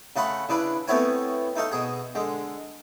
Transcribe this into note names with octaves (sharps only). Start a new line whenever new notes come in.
C#3 A3 A4 F#5 B5 C6
C#3 D4 E4 B4
A3 B3 C4 E4 C#5 G#5
A3 D#4 A4 F5
B2 G#4
D3 G#3